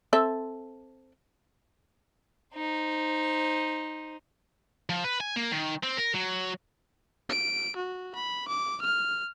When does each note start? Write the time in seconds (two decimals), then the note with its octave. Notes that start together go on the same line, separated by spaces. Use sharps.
0.13 C4 A4 E5
2.54 D#4 C5
4.90 F3
5.04 B4
5.20 G#5
5.36 A#3
5.52 D#3
5.83 C4
5.97 A#4
6.14 F#3
7.29 D7
7.76 F#4
8.15 B5
8.48 D6
8.82 F6